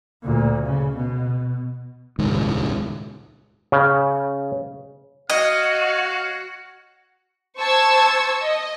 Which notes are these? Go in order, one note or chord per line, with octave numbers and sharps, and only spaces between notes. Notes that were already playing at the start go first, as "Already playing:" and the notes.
D2 A#2
C#3
B2
D#1 C#2 G#2 D#3
C#3
F#4 C#5 D#5 F5
C5 A5 C#6 E6 G#6
D#5